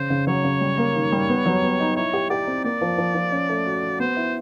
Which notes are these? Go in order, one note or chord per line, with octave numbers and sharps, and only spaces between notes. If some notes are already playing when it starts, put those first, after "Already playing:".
Already playing: C#3 C5
C#3
F#3 C#5
C#3
G3
A#3
D#3
G3
B3
F#3
B3
D#4
E4 C#5
G4
G4 D5
C4
A#3 D5
F3
F3
F3
C#4
A3
F#4
F#4
B3 C5
E4